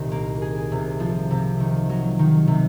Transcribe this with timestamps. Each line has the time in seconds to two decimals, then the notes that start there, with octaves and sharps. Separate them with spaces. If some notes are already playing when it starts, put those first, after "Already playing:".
Already playing: C2 A#2 D#3 C4
0.12 A#3
0.42 G#4
0.72 C3
1.00 F3
1.31 C3
1.60 D#3
1.89 F#3
2.19 D#3
2.48 C3